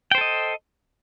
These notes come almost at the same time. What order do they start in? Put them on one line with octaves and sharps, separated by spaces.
G5 C5 A4 D#5